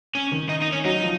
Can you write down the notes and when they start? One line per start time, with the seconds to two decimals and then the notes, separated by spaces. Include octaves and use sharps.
0.15 C#4
0.32 D#3
0.49 D#4
0.62 D#4
0.72 C#4
0.85 F#3 D#4
1.03 F3